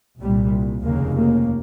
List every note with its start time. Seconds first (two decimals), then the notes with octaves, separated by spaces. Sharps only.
0.20 C2 A#2 G3
0.84 F1 D#2 C#3 A#3
1.16 A#3